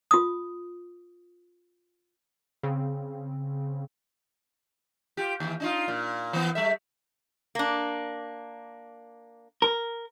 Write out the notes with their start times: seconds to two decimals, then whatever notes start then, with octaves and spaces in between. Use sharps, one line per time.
0.11 F4 D#6
2.63 C#3 C4
5.17 F4 G4
5.40 D#2 E3
5.60 D4 D#4 F4
5.88 A#2
6.33 E3 B3
6.55 G3 A4 E5
7.55 A#3 D4
9.62 A#4